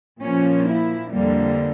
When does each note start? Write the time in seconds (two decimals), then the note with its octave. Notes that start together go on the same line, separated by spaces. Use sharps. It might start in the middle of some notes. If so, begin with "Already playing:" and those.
0.21 A#2 F3 A#3 C#4
0.66 E4
1.12 F2 D3 G3 A#3